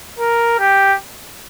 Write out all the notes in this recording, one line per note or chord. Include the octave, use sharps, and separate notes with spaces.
A#4
G4